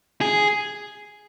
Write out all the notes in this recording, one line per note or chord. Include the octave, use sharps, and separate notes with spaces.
G#4